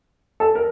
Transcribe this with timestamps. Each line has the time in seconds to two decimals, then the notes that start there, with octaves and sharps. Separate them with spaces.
0.40 A4
0.55 A#4